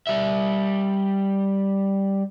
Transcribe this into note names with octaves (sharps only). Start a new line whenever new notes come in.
G3 E5